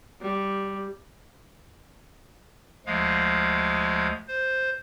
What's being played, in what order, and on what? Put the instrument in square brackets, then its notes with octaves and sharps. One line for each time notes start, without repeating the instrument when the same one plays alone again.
[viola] G3
[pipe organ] D2 F3 G#3 F5
C5